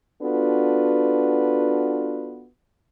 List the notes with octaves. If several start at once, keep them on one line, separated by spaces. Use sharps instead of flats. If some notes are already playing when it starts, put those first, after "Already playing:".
B3 D4 F4 F#4 A4 B4